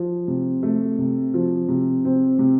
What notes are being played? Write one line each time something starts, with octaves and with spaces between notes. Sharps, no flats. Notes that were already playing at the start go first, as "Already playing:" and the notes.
Already playing: F3
C3
A3
C3
F3
C3
C4
C3